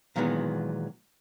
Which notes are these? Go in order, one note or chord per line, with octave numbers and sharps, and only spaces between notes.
A#2 D#3 E3 F#3 G#3 B3